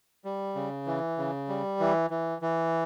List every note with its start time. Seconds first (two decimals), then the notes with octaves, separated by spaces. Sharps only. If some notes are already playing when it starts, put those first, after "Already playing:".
0.25 G3
0.55 C#3
0.87 E3
1.18 C#3
1.48 G3
1.80 E3
2.10 E3
2.42 E3